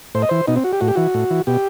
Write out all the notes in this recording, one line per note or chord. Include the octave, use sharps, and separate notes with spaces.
A2 C5
D#5
E3 C5
B2 D#4
C4
F#4
G4
A2 F#4
G4
E3 F#4
A2
E3
B2 G4